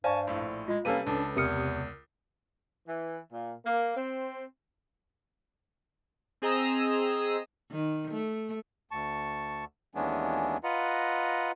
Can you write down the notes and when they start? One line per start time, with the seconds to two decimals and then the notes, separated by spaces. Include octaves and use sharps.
0.04 G2 C5 D5 F5 G#5 A5 C#6
0.27 A#1 A2
0.68 G#3 F4
0.85 C3 G3 A#3 C#4 A4 B4 D#7
1.07 C#2 D4
1.36 E2 C3 A#4 D#6 F6 C#7
2.87 E3
3.31 A#2
3.65 A#3
3.96 C4
6.42 C4 G#4 D#5 A#5 D#6 E6
7.71 D#3
8.11 A3
8.91 D2 A5 C#6
9.95 D#2 E3 G#3 B3 C#4 D4
10.64 F4 B4 D#5 F#5 A#5